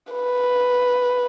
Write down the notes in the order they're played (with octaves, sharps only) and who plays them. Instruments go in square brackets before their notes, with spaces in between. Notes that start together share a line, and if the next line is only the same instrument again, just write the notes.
[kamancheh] B4